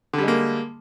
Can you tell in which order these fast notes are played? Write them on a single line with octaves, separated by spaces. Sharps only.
D3 G3 G#3 A#3